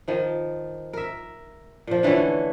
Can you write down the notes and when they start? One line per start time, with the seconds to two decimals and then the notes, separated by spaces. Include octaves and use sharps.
0.08 D#3 F3
0.93 A#4 E5
1.87 A#2 F3
2.03 D3 E3 A3 C#4